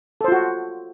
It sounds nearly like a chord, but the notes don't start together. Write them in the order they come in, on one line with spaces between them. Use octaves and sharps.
A4 C5 F4 F#4